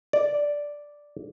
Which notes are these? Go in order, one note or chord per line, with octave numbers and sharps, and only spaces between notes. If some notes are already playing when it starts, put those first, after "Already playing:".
D5